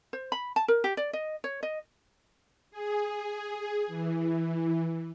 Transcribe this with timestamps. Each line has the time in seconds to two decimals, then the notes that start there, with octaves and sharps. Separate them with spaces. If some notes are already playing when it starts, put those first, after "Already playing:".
0.13 C5
0.32 B5
0.56 A5
0.68 A#4
0.84 G4
0.97 D5
1.13 D#5
1.44 C#5
1.63 D#5
2.70 G#4
3.87 E3